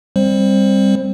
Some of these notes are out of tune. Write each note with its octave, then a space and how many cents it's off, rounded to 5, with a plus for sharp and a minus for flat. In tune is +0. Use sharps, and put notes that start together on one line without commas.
G3 +20 C4 +10 C5 +20